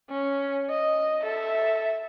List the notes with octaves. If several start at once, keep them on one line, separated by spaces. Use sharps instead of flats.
C#4
D#5
A4 E5